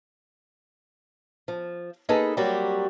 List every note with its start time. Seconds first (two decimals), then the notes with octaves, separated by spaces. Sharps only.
1.48 F3
2.09 A#3 D#4 G#4 A4 B4
2.37 F#3 G3 A#3 C4 F#4 G4